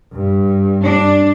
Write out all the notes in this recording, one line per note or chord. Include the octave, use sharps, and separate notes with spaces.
G2
D4